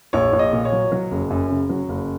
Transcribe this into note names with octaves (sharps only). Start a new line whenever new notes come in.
A#1 C#5
A#1
D#5
A#2
C#5
F#3
F#3
F#1
F#2
C#3
F#3
F#1